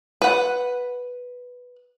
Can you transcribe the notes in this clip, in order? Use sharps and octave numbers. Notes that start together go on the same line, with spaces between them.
B4 F#5